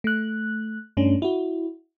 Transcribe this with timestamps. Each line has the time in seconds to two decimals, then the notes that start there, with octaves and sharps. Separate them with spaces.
0.04 A3 F#6
0.97 G2 A3 C#4 D4
1.22 E4 F#4